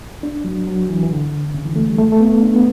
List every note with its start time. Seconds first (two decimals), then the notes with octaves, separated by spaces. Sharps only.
0.23 D4
0.44 F#3
0.67 F#3
0.89 E3
1.03 E3
1.11 D3
1.54 C#3
1.65 E3
1.76 A3
1.87 G3
1.98 A3
2.12 A3
2.20 B3
2.42 D4
2.56 B3